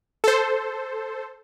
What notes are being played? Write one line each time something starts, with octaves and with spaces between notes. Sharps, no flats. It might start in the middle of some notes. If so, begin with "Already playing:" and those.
A4 C5